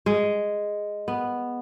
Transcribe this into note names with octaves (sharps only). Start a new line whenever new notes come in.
G#3
B3